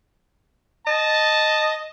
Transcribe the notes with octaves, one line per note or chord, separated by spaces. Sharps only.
D#5 A5